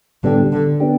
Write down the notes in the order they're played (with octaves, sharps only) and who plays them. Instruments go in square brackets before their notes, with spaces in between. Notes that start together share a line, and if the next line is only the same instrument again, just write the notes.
[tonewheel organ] A2 G3 B3 D4 G4 [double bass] D3
[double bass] D3
[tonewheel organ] B3 D4 G4